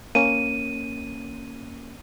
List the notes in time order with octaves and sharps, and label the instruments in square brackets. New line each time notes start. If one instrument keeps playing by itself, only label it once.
[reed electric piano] A#3 C#4 [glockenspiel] D#7